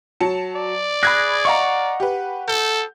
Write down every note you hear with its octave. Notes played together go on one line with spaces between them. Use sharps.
F#3 A5 C#7
D5
G#4 B5 F#6 G#6 A#6
D#5 F5 F#5 A#5 C#6
G4 B4
A4 G6